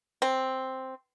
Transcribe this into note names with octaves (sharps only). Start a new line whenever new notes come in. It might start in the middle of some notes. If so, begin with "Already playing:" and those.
C4